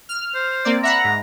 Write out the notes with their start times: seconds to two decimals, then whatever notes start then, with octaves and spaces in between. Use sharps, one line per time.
0.09 F6
0.35 C5
0.65 A#3 C4 D5
0.83 E5 F#5 A#5 B5
1.04 G#2